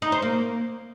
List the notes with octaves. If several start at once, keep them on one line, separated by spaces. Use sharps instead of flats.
D#4
C5
A#3